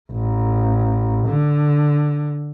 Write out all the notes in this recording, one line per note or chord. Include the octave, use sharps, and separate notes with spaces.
A1
D3